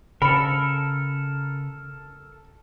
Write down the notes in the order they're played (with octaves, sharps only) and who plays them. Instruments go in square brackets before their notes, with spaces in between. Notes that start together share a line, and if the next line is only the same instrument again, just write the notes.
[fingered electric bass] C#3 [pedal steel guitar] A4 A#4 [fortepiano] B5